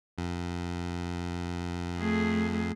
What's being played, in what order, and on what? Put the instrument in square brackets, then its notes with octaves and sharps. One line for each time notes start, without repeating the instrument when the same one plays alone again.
[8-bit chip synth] F2
[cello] A3 G#4